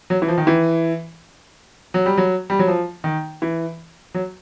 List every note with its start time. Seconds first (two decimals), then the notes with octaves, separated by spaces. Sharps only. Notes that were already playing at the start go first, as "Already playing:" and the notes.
0.10 F#3
0.22 E3
0.28 F3
0.38 D#3
0.47 E3
1.94 F#3
2.06 G3
2.17 F#3
2.50 G3
2.59 F#3
2.68 F3
3.04 D#3
3.42 E3
4.14 F#3